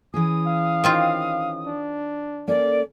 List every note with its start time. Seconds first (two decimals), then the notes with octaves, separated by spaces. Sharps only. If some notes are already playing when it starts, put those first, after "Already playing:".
0.14 E3 C#4 G#4 D#6
0.46 F5
0.84 D#3 C4 F4
1.66 D4
2.48 A#3 C#4 A4 D5